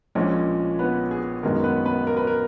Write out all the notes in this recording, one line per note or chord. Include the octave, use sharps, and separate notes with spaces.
A#1 A#2 F3 G#3 C#4
B3 B4
G#4
G#1 F#2 D#3 G#3 B3 A#4
B3 B4
B3 B4
A#4
B4
A#4